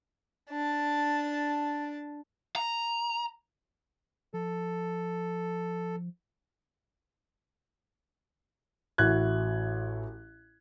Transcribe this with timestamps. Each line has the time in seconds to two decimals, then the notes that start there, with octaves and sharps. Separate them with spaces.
0.50 D4 A5
2.56 A#5
4.34 F3 A4
8.98 A1 E4 F#4 F#6 G#6